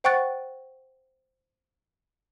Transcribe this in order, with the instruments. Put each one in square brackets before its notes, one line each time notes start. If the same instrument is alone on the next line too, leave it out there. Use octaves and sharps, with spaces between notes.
[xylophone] C5 F#5 G5 C#6 F#6 A6